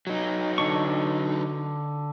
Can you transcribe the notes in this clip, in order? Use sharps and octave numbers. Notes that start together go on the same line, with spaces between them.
F#3 D#4
D3 D4 C#6